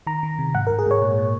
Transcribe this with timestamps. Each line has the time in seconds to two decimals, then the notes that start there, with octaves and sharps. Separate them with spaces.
0.07 D#3 A#5
0.23 D#3
0.39 C3
0.55 G#2 F#5
0.67 A#4
0.70 G#2
0.79 G#4
0.86 G#2 C#5
1.02 A#2
1.18 A#2